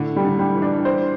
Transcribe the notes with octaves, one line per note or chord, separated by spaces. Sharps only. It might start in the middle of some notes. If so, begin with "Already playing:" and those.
Already playing: A2 D3
G3
D3
G3
E3
D4
C5